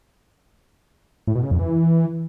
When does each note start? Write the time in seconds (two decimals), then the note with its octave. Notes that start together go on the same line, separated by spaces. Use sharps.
1.27 A2
1.35 B2
1.43 C#3
1.51 F2
1.59 E3